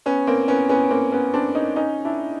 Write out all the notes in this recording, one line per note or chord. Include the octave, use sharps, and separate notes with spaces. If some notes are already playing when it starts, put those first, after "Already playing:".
B3 C#4
A#3 C4
B3 C#4
B3 C#4
A#3 C4
B3 C#4
C4 D4
C#4 D#4
C#4 D#4
D4 E4